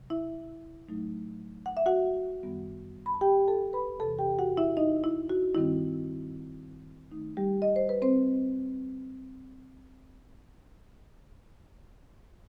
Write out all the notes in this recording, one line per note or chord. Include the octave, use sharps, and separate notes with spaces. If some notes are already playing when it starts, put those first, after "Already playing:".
Already playing: C3 F#3
E4 E5
A2 F#3 A3 D#4
F#5
E5
F#4 F#5
F#2 D#3 G3 B3
B5
A5
G4 G5
A4 A5
B4 B5
E2 C3 E3 A4 A5
G4 G5
F#4 F#5
E4 E5
D#4 D#5
E4
F#4
G2 D#3 G3 C4 D#4 E4
D#3 A3 D#4
G3 G4
D#5
C5
B4
C4 C5